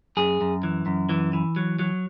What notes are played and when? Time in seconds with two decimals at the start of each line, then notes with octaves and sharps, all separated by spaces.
0.17 F#2 G#4
0.41 F#2
0.63 E3
0.86 F#2
1.09 E3
1.33 E3
1.56 F#3
1.79 F#3